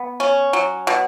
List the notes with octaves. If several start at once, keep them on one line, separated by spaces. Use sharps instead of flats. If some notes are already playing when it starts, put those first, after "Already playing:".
Already playing: B3
C#4
F#3
B2